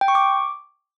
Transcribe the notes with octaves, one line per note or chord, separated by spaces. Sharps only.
G5
C#6
D6